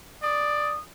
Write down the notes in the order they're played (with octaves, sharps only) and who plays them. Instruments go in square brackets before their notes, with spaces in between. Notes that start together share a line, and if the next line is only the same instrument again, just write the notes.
[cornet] D5 [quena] D#6